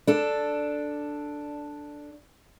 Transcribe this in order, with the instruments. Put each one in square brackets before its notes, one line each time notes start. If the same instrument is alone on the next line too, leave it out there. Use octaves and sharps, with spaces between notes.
[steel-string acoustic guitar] D4 A4